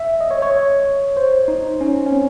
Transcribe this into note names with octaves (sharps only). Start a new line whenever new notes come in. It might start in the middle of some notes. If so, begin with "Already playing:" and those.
Already playing: E5
D#5
C#5
C#5
C5
D#4
C#4
C#4
C4